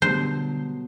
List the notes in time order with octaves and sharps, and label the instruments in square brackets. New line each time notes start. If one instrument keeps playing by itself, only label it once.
[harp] B2 F#3 A3 [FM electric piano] D3 G3 [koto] C5